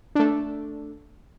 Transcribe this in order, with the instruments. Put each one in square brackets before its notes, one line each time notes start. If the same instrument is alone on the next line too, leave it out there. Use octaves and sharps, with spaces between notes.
[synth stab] A3 D4